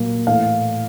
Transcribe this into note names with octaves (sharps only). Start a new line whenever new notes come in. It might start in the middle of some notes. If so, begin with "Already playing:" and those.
Already playing: A#2 F#3 A#3
A2 E3 A3 F5